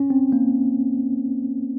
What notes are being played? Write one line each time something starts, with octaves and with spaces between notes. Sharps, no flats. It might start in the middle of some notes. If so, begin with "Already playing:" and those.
Already playing: C#4
C4
A#3